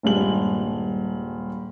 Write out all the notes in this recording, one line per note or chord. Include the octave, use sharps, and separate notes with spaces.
D#1 G2 G#3 F#7